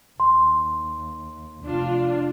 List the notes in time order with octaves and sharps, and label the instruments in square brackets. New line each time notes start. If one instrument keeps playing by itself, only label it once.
[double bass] D#2 [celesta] C6
[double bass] F1 [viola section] D4 F4